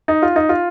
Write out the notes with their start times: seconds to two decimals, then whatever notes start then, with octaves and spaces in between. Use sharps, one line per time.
0.08 D#4
0.22 F4
0.36 D#4
0.49 F4